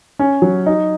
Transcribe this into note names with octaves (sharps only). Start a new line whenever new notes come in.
C#4
F#3
D#4